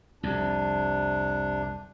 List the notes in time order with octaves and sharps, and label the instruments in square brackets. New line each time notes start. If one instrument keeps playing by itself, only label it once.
[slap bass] C2 F2 [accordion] C3 D4